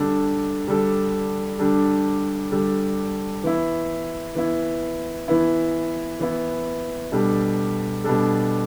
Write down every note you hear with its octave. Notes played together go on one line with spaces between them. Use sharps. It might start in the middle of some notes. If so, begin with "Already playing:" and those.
Already playing: D3 G3 D4 A4
D3 G3 D4 A4
D3 G3 D4 A4
D3 G3 D4 A4
E3 B3 E4
E3 B3 E4
E3 B3 E4
E3 B3 E4
B2 G3 D4 A4
B2 G3 D4 A4